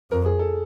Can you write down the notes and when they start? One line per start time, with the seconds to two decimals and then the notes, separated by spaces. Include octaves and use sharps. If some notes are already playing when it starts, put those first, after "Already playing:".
0.11 F2 A#4
0.26 G#4
0.39 A4